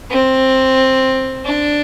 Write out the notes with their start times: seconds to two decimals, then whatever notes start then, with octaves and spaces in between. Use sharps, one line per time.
0.10 C4
1.45 D4